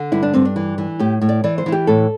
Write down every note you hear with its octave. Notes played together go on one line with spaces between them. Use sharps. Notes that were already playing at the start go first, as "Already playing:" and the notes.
Already playing: D3
G2 E4
D4
G2 C4
D4
E3
E3
A2 G4
A2
D5
E3 D5
C5
E3 E4
G4
A2 A4